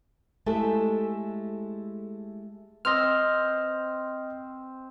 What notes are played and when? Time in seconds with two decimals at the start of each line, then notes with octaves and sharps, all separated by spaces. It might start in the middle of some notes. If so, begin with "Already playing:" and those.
0.46 G#3 A3 E4 G4 A4
2.85 C4 C5 D#5 F6